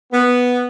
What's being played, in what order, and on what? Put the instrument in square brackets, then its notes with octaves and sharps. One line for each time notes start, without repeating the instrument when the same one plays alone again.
[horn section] B3